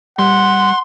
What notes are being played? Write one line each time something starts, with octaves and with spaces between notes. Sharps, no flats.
G3 F#5 C6